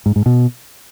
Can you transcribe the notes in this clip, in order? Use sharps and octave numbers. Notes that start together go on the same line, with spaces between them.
G#2
G#2
B2